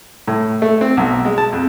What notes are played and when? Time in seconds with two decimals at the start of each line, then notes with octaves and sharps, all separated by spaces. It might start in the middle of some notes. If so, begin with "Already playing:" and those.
0.28 A2
0.62 A3
0.81 C4
0.97 B1
1.25 G#3
1.38 A5
1.53 F2